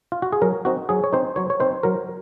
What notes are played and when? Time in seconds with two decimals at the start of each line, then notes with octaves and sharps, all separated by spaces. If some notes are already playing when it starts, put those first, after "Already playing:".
0.12 F4
0.22 F#4
0.33 G#4
0.42 F#3 A#4
0.65 C4 D#4 F#4
0.89 F#3 G#4
1.04 C#5
1.13 C4 D#4 C5
1.36 F#3 C#5
1.50 C#5
1.60 C4 D#4 C5
1.83 F#3 A#4